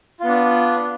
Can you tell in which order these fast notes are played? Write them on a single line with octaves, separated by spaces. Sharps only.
F4 B3 D4